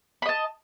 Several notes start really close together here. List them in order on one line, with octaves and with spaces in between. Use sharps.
B5 D#5 A5